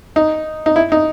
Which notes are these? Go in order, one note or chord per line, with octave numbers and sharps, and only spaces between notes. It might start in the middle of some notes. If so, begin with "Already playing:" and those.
D#4
D#4
E4
D#4